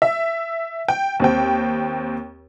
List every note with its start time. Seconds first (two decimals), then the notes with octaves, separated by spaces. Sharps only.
0.02 E5
0.88 G5
1.20 D#2 C4 G5